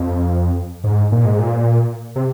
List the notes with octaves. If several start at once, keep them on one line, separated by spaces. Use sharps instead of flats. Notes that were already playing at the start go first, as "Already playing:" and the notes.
Already playing: F2
G#2
A#2
G#2
A#2
C3